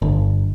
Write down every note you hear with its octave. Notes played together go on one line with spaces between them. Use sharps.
G1